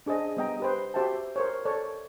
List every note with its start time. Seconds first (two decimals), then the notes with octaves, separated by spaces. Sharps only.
0.06 D4 G#4 C5 D#5
0.37 G3 B3 D#5 G5 A#5
0.60 G4 B4 C5
0.94 F#4 G4 C5 E5 G5 A5
1.36 A#4 C5 C#5
1.65 A4 C#5 D5